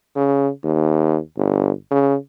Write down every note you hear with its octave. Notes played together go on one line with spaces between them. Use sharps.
C#3
D#2
G1
C#3